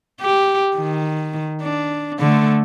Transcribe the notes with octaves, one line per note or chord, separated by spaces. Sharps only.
G4
D#3
D4
D3 A3